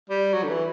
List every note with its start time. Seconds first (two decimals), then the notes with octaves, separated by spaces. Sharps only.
0.10 G3
0.34 F#3
0.43 D3
0.49 E3